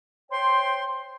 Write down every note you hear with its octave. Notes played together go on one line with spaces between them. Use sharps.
C5 C#5 G5 C6